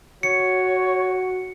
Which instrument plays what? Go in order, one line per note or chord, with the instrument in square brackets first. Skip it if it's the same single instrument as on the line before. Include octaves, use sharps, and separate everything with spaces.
[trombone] F#4 [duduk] C#5 [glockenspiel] C#7